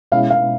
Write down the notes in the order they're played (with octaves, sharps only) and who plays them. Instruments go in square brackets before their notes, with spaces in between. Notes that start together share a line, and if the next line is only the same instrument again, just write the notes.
[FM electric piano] B2 G#3 C#4 E4 [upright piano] F5
[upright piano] F5